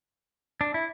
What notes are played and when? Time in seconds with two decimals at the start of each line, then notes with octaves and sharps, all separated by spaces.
0.61 D4
0.74 E4